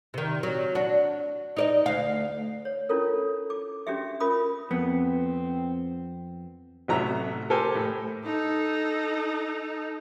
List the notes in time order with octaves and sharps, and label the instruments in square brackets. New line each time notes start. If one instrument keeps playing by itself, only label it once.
[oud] C3 D#3
F#3
D4 F#4
D#4 D5 D#5
D2 F5
[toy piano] C#5
C#4 D4 E4 F4 A4 A#4
D6
C#4 D4 F#4 G4 E5
C#4 F4 A#4 B5 D#6
[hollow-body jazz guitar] F2 B3 [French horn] C4
[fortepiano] A1 C3 F#3 A3 A#5
G4 A4 A#4 C5 G#5
A2
[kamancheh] D#4 A4